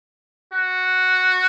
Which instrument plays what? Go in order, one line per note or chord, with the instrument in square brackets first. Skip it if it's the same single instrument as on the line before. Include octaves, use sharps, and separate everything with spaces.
[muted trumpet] F#4